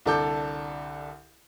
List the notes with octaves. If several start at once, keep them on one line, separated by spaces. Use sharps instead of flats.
C2 D3 A4 D6 G6